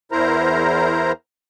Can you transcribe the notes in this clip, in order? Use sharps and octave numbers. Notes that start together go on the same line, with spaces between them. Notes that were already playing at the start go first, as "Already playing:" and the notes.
E2 E4 A#4 C5 A#5